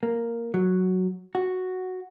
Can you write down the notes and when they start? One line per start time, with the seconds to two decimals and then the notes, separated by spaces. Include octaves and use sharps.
0.03 A#3
0.54 F#3
1.35 F#4